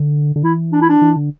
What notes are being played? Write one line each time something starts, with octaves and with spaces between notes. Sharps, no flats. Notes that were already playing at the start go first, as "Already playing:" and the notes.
Already playing: D3
D3
E3 E4
D4
E4
D4
E3
D3